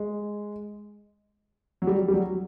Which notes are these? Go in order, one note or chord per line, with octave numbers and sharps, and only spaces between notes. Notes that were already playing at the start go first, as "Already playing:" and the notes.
Already playing: G#3
F#3
G3
G3
F#3